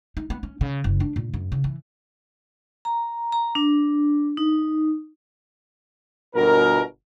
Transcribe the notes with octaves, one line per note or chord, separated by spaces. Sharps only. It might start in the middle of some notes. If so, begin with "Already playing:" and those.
D#4
B3
C#4
C#3
F#1
D4
A#2
F#2
C#3
E3
A#5
A#5
D4
D#4
G1 B2 A#4